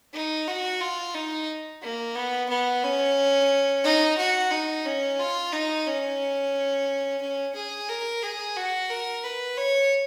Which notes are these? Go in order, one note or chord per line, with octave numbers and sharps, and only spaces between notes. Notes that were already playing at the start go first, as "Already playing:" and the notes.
D#4
F#4
F4
D#4
A#3
B3
B3
C#4
D#4
F#4
D#4
C#4
F4
D#4
C#4
C#4
G#4
A#4
G#4
F#4
A#4
B4
C#5